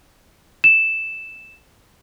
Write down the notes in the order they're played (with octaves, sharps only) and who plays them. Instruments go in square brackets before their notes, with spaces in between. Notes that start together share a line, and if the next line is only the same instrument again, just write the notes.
[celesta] E7